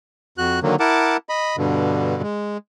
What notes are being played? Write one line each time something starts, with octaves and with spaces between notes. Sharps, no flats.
F2 F#4 F#6
D3 D#3 F#3 A#3
E4 A#4 F#5 A5 D6
D#5 B5
G2 B2 D3
G#3